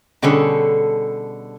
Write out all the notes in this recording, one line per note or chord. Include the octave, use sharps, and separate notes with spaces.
B2 D3 G3 C#4 G#4 A4